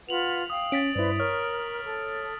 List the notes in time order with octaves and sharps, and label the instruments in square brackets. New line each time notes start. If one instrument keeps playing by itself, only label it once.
[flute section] F4 B4 F#5 [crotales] F7 F#7
[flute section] F5 G5 [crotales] D#6
[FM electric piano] C#4 [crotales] A6 B6 D7
[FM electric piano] G2 E4 [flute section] B4 C5 D5
[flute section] A#4 [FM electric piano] C#5 [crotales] F6
[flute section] A4